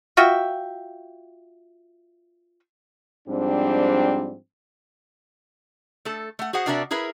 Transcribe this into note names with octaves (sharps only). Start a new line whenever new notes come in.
F4 F#4 E5 G5
G#2 F3 G3 C4 D4
A3 A4
A3 F#5
F#4 G#4 C5 F#5
C3 D4 F#4 A#4 D5 E5
E4 G#4 A#4 B4 E5